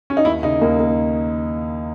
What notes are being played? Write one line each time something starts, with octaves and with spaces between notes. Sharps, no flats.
C#4
D#4
D#2 E4
C#3 D#4
D#2 A#3
A#3